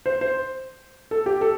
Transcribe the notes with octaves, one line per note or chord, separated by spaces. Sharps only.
C5
C5
A4
G4
A4